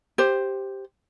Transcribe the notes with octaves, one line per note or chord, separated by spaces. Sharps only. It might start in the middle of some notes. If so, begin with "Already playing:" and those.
G4 C5